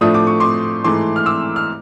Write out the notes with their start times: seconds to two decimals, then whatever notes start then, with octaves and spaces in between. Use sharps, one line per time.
0.01 A2 F3 A3 D4 D#6
0.14 D6
0.27 C#6
0.40 C6 D6
0.84 G#2 E3 A3 C6 D6
1.16 F6
1.26 D6 E6
1.56 F6